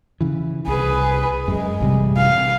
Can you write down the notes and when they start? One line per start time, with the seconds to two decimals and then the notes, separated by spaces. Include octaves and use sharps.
0.21 C#3 E3
0.67 C2 G#4 B4
1.48 F#2 G#3
1.80 A1 C3 G3
2.17 F5